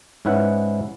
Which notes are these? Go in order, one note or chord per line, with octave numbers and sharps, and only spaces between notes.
G#2 C#4 E4 B4 F#5